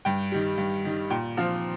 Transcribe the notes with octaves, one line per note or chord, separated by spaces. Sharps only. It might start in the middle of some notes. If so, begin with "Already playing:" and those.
G2 G5
D#3 G3
G2
D#3 G3
A#2 G5
F3 C4 F5